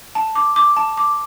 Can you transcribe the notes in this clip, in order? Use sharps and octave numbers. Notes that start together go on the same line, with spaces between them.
A5
D6
D6
A5
D6